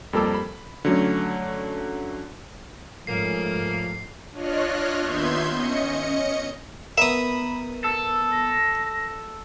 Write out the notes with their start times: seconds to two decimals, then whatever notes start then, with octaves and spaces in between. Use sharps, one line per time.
0.13 F2 G3 A#3 A4 D6 E6
0.34 B5
0.85 D3 F#3 A3 C#4
3.07 G#2 C#3 F3 A3 A#3 C7
4.32 D4 F4 C#5 D#5 F6 F#6
4.99 D#2 B3 E5 C6 G6 G#6
5.51 C#4 D#5 C#7
6.98 B3 A#4 E5 B5 D#6
7.84 A4 E6
8.31 A#6